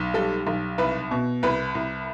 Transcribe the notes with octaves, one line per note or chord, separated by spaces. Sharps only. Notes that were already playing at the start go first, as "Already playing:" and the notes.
Already playing: B1
G3 A4
B1
C2 B4
B2
C2 B4
C2